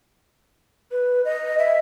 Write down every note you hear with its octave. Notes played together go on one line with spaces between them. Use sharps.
B4
D#5
E5